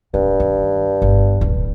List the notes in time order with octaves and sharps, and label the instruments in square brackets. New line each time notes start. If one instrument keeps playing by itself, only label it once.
[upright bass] D1 [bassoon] G2
[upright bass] D#3
G1
D1